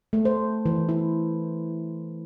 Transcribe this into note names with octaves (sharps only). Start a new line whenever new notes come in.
A3
C5
E3
E4